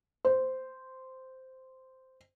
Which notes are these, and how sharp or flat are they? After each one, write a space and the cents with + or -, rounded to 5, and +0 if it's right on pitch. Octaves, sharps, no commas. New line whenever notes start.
C5 -10